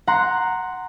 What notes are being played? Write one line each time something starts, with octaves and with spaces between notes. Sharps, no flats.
F#5 A#5 C6